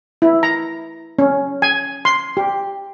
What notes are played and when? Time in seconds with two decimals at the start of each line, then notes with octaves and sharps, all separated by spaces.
0.22 E4
0.43 A#5
1.19 C#4
1.62 G#5
2.05 C6
2.37 G4